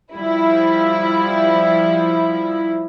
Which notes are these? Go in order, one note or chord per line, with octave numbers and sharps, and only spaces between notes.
F3 G3 E4